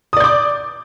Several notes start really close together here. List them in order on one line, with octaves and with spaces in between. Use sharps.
D#6 D5 G6 D6